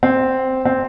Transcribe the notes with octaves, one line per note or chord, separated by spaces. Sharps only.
C4
C4